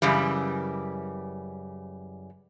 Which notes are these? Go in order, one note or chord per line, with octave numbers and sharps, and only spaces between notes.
F#2 C#3 E3 G3